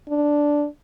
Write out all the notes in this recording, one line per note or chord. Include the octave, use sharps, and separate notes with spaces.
D4